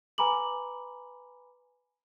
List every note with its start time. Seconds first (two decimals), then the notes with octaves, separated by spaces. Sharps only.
0.18 B4 G#5 A#5 B5 D6 F#7